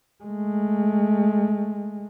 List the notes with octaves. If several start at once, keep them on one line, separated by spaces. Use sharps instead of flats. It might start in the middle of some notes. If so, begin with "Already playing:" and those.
G#3 A3